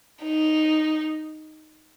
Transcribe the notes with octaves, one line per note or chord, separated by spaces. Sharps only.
D#4